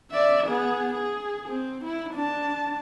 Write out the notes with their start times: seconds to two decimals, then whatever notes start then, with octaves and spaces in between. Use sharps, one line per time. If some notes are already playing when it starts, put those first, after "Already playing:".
0.11 D5 E5
0.47 B3 G#4
0.94 G#4
1.48 C4
1.85 E4
2.14 D4 A5